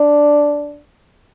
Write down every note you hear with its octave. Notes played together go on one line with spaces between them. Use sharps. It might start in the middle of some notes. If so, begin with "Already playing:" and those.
Already playing: D4